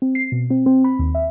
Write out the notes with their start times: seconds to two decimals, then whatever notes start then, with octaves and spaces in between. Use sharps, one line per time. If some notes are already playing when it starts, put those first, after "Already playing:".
0.02 C4
0.15 C7
0.32 B2
0.50 C4
0.66 C4
0.84 B5
0.99 D#2
1.15 E5